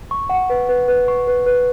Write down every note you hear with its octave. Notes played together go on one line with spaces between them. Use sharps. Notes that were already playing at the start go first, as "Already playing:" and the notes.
C#6
F#5
B4
B4
B4
C#6
B4
B4